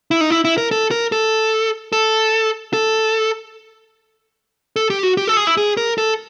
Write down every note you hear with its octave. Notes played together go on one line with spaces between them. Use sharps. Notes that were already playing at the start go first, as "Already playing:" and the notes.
E4
D#4
E4
E4
A#4
A4
A#4
A4
A4
A4
A4
G4
F#4
G4
A4
G#4
E4
G#4
A#4
A4